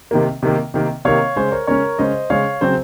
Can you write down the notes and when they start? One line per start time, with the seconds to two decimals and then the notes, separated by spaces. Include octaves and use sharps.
0.11 C3 D#3 A#3
0.43 C3 D#3 A#3
0.74 C3 D#3 A#3
1.05 C3 D#3 A#3 C#5 F5
1.36 C#3 G#3 C#4 C5
1.52 A#4 C#5
1.67 C#3 G#3 C#4 A#4 C#5
1.99 C#3 G#3 C#4 C5 D#5
2.30 C#3 G#3 C#4 C#5 F5
2.61 C#3 F#3 C4 C5